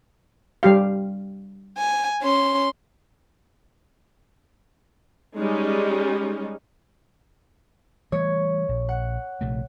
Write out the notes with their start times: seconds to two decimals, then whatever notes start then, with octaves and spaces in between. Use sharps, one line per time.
0.63 G3 G4 F5
1.78 G#5
2.22 C#4 C6
5.36 G3 G#3 C#4 D#4
8.12 E3 G3 A3 C#5
8.69 A#1
8.89 F#5
9.41 A#1 C3 A3